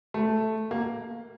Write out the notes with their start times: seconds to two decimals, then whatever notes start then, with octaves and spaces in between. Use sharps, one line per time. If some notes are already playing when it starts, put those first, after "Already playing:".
0.14 A3
0.71 A#3